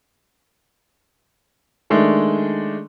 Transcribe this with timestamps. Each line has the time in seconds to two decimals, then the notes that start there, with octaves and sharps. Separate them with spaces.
1.90 D#3 G#3 A3 D4